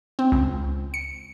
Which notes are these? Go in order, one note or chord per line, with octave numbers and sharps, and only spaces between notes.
C4
C#2
C#7